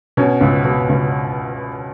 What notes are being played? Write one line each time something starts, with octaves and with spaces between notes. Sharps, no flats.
B2 C#4
C#2
B2
C#2